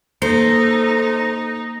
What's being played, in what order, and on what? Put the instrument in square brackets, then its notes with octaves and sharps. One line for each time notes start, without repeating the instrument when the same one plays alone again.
[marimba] A#3 [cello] D#4 [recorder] A4 [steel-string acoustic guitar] C5